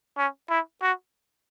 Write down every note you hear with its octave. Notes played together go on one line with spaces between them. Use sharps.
C#4
E4
F#4